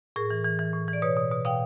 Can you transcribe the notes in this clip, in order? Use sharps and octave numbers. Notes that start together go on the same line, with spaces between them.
A2 G#4 A#4
E3
E3
E3
A2
E3
D5
B2 B4 C#5
B2
B2
B2 F5 G5